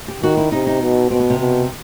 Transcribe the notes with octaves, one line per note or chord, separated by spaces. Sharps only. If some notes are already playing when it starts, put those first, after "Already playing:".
G4
D#3 F#4
E4
C3 D#4
D#4
B2
B2 C4
B3
C3
B2